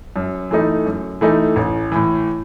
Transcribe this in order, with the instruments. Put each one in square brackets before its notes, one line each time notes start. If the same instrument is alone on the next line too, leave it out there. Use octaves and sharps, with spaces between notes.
[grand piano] F#2
E3 A3 D#4
F#2
E3 A3 D#4
A1
A2 E3